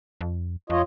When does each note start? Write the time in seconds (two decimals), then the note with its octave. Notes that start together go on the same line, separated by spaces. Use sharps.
0.21 F2
0.70 F2 F4 C#5 D#5